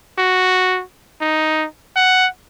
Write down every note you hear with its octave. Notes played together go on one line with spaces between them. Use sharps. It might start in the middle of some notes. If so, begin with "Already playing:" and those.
F#4
D#4
F#5